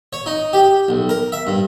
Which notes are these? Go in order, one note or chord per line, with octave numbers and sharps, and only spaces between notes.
C#5
D#4
G4
B1
A#4
E5
G2